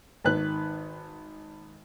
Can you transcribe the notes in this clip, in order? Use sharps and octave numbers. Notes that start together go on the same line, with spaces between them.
G#1 D#3 B4 F#6